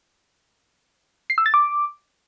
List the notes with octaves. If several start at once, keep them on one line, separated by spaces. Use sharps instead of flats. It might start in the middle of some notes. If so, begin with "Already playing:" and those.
C7
E6
A6
D6